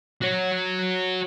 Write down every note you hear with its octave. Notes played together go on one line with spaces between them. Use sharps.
F#4 C#5